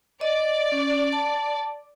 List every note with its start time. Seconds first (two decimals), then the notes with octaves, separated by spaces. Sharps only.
0.21 D5 D#5
0.72 C#4
1.13 A5